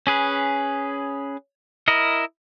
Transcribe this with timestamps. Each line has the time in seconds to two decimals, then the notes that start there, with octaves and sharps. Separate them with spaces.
0.07 C#4 G#4 B4
1.88 E4 A#4 D#5